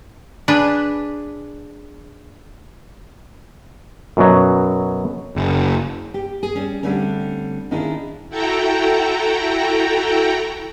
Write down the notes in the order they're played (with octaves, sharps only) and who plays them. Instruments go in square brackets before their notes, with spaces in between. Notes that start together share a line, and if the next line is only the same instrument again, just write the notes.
[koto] D4 G#4 B4
[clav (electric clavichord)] F#2 B2 F#3
[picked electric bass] F#1
[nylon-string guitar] G4
G#4
G3 C#4
D3 G3 A3 C4 C#4
D#3 C#4 D4 E4 F4 G#4
[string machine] E4 F#4 A4 G5 A#5